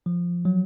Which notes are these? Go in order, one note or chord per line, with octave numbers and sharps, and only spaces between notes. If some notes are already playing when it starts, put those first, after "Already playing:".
F3
F#3